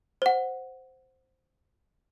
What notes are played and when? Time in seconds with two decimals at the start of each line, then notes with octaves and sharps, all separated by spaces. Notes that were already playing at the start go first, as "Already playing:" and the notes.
0.22 C5 F#5